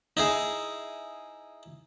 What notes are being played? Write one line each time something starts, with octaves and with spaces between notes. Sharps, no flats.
D#4 E4 G#4